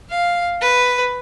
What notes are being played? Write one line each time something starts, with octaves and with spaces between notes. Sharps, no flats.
F5
B4